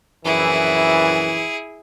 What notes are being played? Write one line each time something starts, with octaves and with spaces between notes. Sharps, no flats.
A#1 F#2 E3 E4 G#4